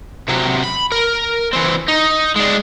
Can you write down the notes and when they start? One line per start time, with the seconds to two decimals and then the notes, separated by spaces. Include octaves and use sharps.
0.28 C3 F#3
0.64 B5
0.92 A#4
1.53 E3 C4
1.88 D#4
2.36 G#3 D4